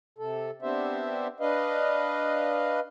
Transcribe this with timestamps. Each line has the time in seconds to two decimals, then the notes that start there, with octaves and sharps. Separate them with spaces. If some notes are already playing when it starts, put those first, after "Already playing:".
0.18 C3 A4
0.62 B3 C4 D4 G4 C5 E5
1.40 D4 B4 D#5 F5